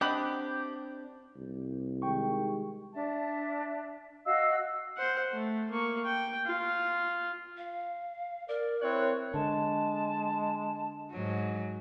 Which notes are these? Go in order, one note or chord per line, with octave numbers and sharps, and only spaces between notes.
C4 D4 G4 D#5 F#5 B5
C2
D#3 G#3 G4 G5 C#6
D4 E5 A5
F#4 D#5 F5 E6
C5 F#5
A3
A#3 C#6
G5
F4
F5
A#4 D5
C4 E4 C#5 F#6
D3 G#3 A5
G#2 F#3